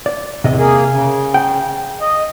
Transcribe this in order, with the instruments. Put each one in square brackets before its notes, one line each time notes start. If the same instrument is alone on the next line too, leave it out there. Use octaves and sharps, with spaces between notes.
[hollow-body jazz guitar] D5
[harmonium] E2 [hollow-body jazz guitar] C3 D#5
[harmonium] A#3 G#4
C#3
[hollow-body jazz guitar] G5
[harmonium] D#5